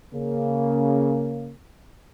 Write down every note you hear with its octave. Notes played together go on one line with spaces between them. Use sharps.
C#3 A#3